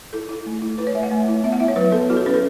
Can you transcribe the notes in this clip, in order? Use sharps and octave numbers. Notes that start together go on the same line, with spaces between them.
E4 A4
E4
A3
E4
E4 B4
C#5
A3 E5
F#5
A3
E4
B3 E5
F#5
E4 E5
C#5
F#3 B4
B3 A4
E4 F#4
A4
C#4 B4
A4